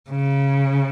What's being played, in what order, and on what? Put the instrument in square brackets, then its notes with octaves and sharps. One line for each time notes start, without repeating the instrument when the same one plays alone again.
[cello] C#3